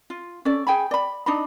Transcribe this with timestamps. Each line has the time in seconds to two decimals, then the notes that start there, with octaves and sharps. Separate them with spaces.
0.10 F4
0.45 C#4 A4 D5
0.67 G#4 G5 G#5 B5
0.91 D5 B5
1.26 D4 D#4 D#5 B5